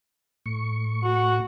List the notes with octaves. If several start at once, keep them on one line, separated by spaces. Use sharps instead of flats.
A2 C#6
F#4